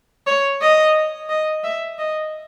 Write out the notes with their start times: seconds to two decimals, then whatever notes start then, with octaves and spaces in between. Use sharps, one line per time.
0.27 C#5
0.61 D#5
1.29 D#5
1.64 E5
1.99 D#5